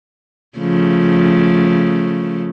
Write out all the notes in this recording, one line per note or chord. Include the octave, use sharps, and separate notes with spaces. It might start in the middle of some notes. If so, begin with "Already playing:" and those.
C#3 F3 A3